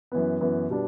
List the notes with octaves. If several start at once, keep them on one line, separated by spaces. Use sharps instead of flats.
F#2 E3 B3
F#2 E3 B3
B2 G3 D4